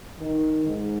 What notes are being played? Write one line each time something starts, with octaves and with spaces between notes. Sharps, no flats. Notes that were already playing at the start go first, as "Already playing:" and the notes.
D#3
G#2